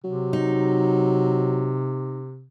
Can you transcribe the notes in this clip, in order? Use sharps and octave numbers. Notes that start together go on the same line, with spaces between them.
C3 F#3
D#4